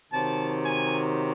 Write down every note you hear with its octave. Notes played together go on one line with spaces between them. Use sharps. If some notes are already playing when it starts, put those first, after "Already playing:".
C3 D#3 F#3 A5
G#5